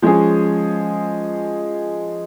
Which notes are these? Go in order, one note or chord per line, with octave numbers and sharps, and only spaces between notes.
F3 G#3 C#4 G#4